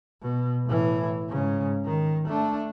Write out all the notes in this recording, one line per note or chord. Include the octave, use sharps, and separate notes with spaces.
B2
A2 E3
G#2 C#3
D#3
A3 D4